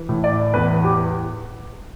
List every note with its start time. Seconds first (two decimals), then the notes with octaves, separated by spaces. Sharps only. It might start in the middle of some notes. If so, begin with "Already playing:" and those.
Already playing: E3
0.09 A2
0.24 D5
0.54 E2 B4
0.84 G4